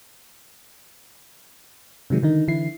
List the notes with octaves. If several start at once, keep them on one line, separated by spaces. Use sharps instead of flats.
C3 D#3 F#3 G#3
D3 D#3 D#4
D3 E3 E4 C7